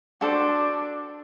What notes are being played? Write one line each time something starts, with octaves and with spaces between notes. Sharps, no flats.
D4 F#4 A4 C5